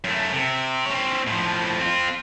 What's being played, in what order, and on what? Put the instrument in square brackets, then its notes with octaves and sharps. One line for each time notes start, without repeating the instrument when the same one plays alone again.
[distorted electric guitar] F#2 A3
C3
C4 C#5
A2 F3
C4 F4